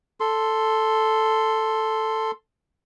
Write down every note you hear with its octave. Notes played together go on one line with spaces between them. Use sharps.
A4 C6